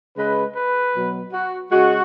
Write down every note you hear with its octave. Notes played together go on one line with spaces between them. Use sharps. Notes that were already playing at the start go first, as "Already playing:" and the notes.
C#3 G#3 B4
B4
B2 F#3
F#4
C#3 G#3 F#4